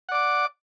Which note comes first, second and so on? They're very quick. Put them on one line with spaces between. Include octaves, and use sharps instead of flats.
F#5 D5 D6